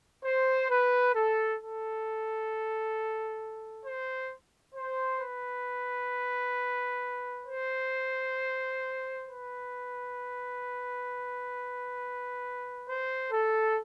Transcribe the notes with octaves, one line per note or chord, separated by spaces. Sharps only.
C5
B4
A4
A4
C5
C5
B4
C5
B4
C5
A4